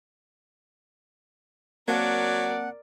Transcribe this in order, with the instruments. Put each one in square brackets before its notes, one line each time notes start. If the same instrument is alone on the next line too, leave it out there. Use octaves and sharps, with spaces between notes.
[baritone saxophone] F#3 [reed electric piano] A#3 C4 A5 [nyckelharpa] A#4 D5 [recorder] F#5